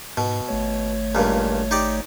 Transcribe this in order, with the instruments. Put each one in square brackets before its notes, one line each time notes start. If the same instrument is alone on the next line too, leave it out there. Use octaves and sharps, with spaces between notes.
[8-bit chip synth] G#2 [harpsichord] B2
[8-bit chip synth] G#1 A3 C#5
[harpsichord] C#2 G2 A#2
D#4 G4 D5